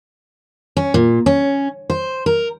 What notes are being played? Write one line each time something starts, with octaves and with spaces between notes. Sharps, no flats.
C#4
A#2
C#4
C5
A#4